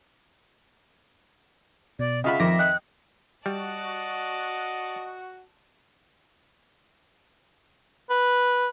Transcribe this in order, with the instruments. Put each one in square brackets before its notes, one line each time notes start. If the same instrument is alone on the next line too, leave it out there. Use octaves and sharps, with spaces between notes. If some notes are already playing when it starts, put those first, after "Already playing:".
[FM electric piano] B2 [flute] D5
[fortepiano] C#3 F4 B5 [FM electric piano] D#5 F#5 [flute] E5
[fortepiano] F2 D#3 [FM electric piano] F3 D6 A#6
[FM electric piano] D#5 G5 [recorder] F#6
[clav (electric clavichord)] G3 [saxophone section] F#4 [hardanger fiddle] D5 A5 [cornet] D#5
[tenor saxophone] B4